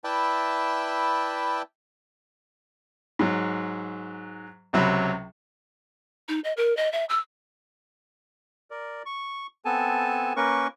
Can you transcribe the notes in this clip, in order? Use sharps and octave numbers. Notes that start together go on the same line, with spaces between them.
E4 B4 D5 E5 G5 A5
G#2 F#3
C#2 C3 F#3 B5
D#4
D#5
A#4
D#5
E5
E6
A#4 D5
C#6
B3 C4 A4 G#5 A5
A#3 C#4 A#4 B4 C#6